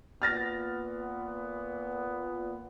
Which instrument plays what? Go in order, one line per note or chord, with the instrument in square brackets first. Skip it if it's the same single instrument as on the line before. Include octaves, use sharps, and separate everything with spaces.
[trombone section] A#2 B3 [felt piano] F6 A6 A#6